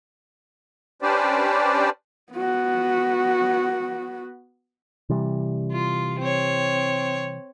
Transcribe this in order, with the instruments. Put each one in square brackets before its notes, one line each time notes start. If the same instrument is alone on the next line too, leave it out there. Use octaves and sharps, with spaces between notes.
[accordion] C#4 D4 G4 B4 C5 D5
[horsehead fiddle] B3 F#4
[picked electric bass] C3 E3 G3
[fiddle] F4
C4 C#5